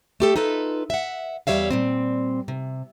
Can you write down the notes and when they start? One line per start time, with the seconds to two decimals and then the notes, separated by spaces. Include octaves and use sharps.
0.20 A3 G4 A4
0.36 D#4 F4 A4 B4
0.90 E5 F#5
1.47 E2 D#3 G3 C#5 E5 F5
1.71 A#2 G3 C4
2.48 C3